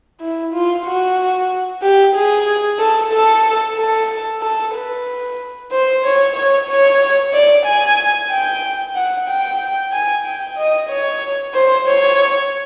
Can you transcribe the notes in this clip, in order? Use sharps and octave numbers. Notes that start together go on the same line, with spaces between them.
E4
F4
F#4
G4
G#4
A4
A4
A4
A4
B4
C5
C#5
C#5
C#5
D5
G#5
G5
F#5
G5
G#5
G5
D#5
C#5
C5
C#5